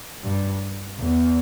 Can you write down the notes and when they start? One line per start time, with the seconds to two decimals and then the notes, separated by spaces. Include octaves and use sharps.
0.23 G2
1.00 E2